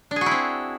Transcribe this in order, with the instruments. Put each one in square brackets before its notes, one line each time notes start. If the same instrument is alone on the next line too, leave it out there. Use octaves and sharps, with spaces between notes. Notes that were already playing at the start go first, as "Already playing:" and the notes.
[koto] D4
G#4
F#4
E4
C4